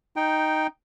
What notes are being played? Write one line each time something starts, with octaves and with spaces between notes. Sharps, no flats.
D#4 G5